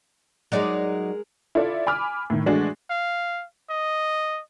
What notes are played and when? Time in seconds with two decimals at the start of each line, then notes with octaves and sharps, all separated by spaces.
0.52 F#3 G#3 D#4 G#4 A#4 D5
1.55 E4 F4 A4 D5
1.87 G#5 B5 D6 F6
2.30 A2 D#3
2.46 E3 G#3 A3 D4 F#4 G#4
2.90 F5
3.70 D#5